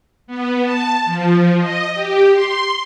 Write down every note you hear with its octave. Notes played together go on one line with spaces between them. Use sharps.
B3
A5
F3
D#5
G4
C6